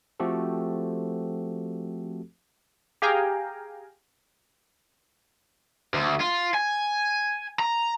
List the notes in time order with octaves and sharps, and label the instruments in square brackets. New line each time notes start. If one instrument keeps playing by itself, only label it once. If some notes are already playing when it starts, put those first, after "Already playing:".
[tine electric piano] F3 A3 C4 F#4 G4 A4
[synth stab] G4 G#4 F5 G5 G#5 A#5
[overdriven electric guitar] D2
F4
G#5
A#5